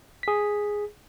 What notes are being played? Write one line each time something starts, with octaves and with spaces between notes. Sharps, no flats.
G#4 B6